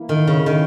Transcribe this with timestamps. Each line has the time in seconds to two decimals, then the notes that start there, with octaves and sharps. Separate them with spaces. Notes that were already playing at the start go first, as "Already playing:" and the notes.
Already playing: E3 A#3 E4
0.09 D#3
0.27 C#3
0.46 D#3